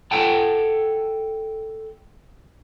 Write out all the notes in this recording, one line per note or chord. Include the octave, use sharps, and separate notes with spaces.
A4 F#5 G5 A5